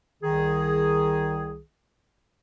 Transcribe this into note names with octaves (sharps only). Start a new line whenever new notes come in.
C2 D#3 G#4